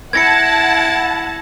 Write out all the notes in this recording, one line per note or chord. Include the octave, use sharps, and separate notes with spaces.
E4 F#5 A5 G#6 A#6 C#7